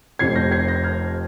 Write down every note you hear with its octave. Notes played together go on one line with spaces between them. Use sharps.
F1 F2 C3 G#6 C7
G6 A#6
G#6 C7
G6 A#6
F6 G#6